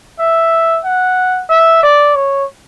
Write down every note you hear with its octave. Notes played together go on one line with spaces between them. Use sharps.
E5
F#5
E5
D5
C#5